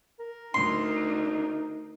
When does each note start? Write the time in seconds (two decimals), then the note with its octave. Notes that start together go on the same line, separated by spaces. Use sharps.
0.20 A#4
0.54 D2 D#4 C6